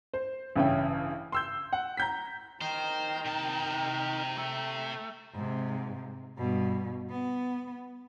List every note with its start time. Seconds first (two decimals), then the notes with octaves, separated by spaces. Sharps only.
0.14 C5
0.56 A1 G2 C#3 C#4 E4 G5
1.32 C6 E6 G6
1.73 F#5
1.97 A#5 G6 B6
2.61 D#3 C5 G5 A#5
3.25 C3 A5
4.38 A3
5.34 G#2 C3
6.37 G2 B2
7.09 B3